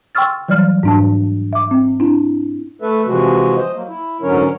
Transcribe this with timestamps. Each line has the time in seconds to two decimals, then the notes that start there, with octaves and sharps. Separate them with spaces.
0.15 G5 C6 C#6 E6 F6 A6
0.48 E3 F#3 G3 D5 F6
0.83 G#2 D4 A5
1.53 E5 D6
1.71 C4
2.00 D4 E4
2.82 A3 A4 B4 E5
3.06 C3 E3 F3 G#3 F#4
3.57 C5 D#5
3.74 F#3 A#3
3.88 E4
4.22 G#2 D3 F#3 C#4 A#4 C#5